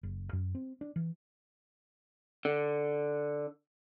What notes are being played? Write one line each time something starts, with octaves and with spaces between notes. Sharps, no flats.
F#1
F#2
C4
D4
E3
D3